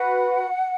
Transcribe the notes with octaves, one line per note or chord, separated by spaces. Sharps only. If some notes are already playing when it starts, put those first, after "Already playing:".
Already playing: F#4 B4 F#5